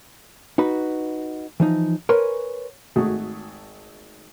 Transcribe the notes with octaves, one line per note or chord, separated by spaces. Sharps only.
D#4 F#4 B4
E3 F3 D#4
A#4 B4 C#5 G#5 C6
G#1 A3 F#4 G#4